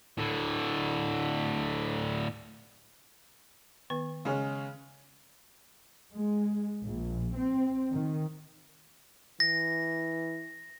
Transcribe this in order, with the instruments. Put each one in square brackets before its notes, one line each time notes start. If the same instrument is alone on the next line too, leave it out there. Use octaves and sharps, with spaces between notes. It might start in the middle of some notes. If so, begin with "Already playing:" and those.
[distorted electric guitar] A2 D3
[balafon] D#3 B3 B4
[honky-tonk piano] C#3 G#3 C#4
[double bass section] G#3
A#1
C4
D#3
[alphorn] E3 [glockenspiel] A#6